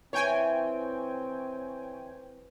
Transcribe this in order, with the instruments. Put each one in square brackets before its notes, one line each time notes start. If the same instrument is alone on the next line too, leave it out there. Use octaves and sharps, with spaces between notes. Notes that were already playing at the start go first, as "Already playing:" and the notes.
[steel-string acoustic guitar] E3 [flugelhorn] C4 [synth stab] C#5 G5 G#5